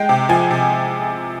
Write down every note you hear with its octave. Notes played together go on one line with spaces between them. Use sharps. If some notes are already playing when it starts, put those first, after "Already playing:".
Already playing: G#3 G5
C3
F3 G#5
C3